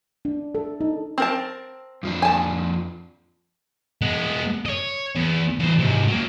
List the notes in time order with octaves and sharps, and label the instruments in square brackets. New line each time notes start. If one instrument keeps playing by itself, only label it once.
[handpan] D4
A4
D#4
[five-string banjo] C4 A#4 A5
[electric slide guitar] F2 F3 D4
[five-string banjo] G#5 A5
[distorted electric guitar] G#3 B3
C#5 D#5
E2
E2 C5
G#2 C3
F#3 A#3